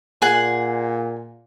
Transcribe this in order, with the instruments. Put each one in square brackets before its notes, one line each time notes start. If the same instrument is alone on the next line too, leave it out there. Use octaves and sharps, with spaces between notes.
[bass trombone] A#2 [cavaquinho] G#4 F#5